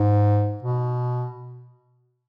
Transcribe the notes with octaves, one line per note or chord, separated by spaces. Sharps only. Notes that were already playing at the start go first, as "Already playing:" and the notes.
Already playing: G#2
B2